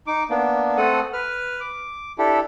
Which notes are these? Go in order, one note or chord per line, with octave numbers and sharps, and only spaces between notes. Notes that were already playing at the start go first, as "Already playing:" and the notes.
D#4 D6
A#3 B3 D4
A3 C4 A4 F#5 D#6
B4 F6
D6
D4 E4 G4 A4